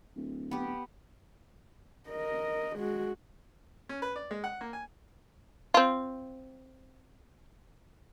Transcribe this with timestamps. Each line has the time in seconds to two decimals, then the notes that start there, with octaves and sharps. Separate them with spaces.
0.16 D1
0.51 B3 G4
2.09 A#4 D#5
2.77 G#3 F#4
3.89 C#4
4.02 B4
4.16 D5
4.31 G#3
4.44 F#5
4.61 A#3
4.73 G#5
5.74 C4 F4